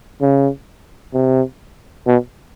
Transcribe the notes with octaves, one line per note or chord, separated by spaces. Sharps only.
C#3
C3
B2